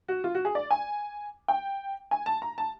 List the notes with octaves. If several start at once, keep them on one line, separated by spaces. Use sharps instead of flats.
F#4
F4
F#4
G#4
D5
G#5
G5
G#5
A5
A#5
A5